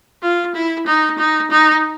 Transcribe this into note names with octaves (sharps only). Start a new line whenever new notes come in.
F4
E4
D#4
D#4
D#4